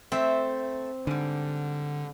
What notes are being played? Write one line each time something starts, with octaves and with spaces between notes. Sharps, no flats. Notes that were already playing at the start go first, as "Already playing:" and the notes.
A3 C4 E5
G#2 D3 G3